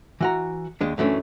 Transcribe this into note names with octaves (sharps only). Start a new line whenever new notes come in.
E3 F#4 A#5
D#2 G#3 D4
F#2 E3 A3 C#4 D4